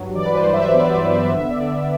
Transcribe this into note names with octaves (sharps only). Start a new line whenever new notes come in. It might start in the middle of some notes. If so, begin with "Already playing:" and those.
Already playing: G2 F#3
E3 D5
B4
C5
G2 D5
E5
B3 D5
B3 C5
D5
C5
D3 E5
D5
D3